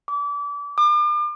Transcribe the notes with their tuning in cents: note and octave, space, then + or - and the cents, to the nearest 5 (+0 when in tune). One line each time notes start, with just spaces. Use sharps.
D6 -30
D6 +40